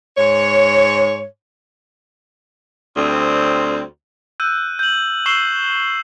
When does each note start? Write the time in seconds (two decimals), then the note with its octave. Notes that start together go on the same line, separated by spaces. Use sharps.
0.16 G#2 C#5
2.97 D2 G3 C4
4.40 E6 F#6 G6 D#7
4.79 G6 F#7
5.26 C#6 E6 C7 E7 G7